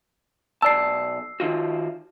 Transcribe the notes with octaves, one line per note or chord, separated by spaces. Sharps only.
B1 D5 A5 E6 C7
D#3 F4 F#4